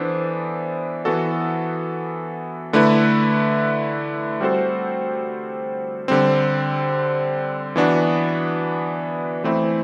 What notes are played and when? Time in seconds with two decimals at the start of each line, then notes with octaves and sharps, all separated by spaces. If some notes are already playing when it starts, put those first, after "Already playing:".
Already playing: E3 B3 D4 A4 C5
1.05 E3 B3 F#4 A4
2.73 D3 A3 E4 B4
4.41 G3 C4 F#4 A4 C5
6.08 D3 G3 C4
7.76 E3 B3 D4 F#4
9.44 E3 A3 C4 E4